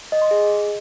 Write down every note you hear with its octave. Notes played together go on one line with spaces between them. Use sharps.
D#5
C6
G#4